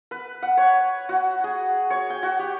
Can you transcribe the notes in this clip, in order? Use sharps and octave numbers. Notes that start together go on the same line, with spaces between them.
B4
F#5
C#5
F#4
G#4
C#5
G5
F#4
G4